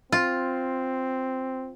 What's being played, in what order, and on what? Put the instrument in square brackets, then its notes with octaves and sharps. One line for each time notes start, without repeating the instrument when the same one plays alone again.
[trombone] C4 [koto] F4